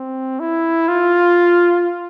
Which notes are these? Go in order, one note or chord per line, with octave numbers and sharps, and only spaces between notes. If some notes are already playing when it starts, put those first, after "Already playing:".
Already playing: C4
E4
F4